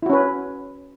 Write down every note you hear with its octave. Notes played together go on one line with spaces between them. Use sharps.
C#4 E4 F#4 B4